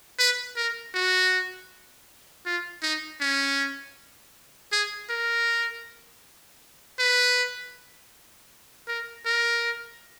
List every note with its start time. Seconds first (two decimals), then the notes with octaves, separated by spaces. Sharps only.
0.19 B4
0.56 A#4
0.94 F#4
2.46 F4
2.83 D#4
3.21 C#4
4.72 G#4
5.10 A#4
6.99 B4
8.87 A#4
9.26 A#4